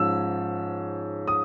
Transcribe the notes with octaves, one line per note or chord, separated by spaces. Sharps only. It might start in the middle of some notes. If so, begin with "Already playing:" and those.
Already playing: G#2 F3 C#4 E6
D#6